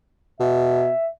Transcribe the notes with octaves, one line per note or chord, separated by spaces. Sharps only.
B2 E5